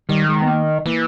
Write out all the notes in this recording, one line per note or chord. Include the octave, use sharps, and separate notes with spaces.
D#3 G3
G#3
B3
A#3
E3 A#3